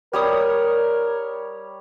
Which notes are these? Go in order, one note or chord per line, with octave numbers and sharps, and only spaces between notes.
G3 A#4 C#5 D#6